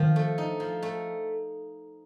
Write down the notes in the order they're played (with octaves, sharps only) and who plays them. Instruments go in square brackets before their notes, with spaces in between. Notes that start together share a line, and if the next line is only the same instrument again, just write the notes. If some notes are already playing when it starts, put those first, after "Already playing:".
Already playing: [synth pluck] D#3 [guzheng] F3
[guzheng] A3
D#4
F3
A3